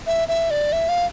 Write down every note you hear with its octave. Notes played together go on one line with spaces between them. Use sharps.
E5
E5
D5
E5
F5